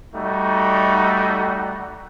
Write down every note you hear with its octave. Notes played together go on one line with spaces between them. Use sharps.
G3 A3 D#4 F#4